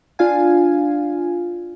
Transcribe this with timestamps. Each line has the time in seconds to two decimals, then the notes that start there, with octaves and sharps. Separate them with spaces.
0.19 D4 F4 F5 G#5